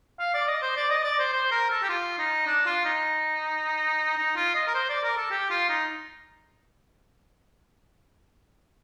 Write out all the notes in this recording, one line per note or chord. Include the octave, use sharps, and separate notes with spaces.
F5
D5
D#5
C5
D5
D#5
D5
C5
C5
A#4
A4
G4
F4
D#4
D4
F4
D#4
D#4
F4
D#5
A#4
C5
D5
A#4
A4
G4
F4
D#4